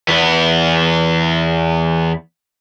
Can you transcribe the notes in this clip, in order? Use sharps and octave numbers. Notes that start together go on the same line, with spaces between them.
E2 B3